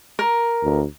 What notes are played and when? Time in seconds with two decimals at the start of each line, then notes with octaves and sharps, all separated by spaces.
0.19 A#4
0.63 D2